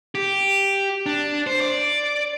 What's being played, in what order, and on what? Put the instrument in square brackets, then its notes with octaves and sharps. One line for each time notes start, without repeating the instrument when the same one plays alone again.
[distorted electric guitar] G4
D4
C5
D5